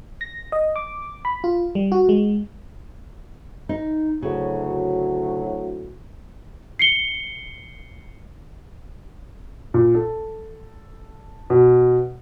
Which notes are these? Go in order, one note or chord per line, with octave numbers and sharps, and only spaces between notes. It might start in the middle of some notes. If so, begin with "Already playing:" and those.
A#6
D#5
D6
B5
F4
G3
F#4
G#3
D#4
D2 A2 C#3 F#3
C7 C#7 G7
A#2
A4
B2